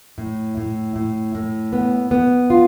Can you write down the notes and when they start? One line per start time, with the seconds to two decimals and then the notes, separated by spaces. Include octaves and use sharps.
0.18 A2
0.57 A2
0.96 A2
1.35 A2
1.73 B3
2.11 B3
2.50 F4